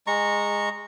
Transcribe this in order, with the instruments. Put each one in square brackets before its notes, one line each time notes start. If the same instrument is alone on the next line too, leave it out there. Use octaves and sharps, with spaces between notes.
[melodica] G#3 A#5 C#6